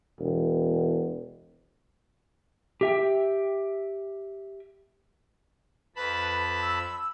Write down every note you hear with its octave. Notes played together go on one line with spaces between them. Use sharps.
E1
G4 E5 G5
F2 B4 A5 B5
E6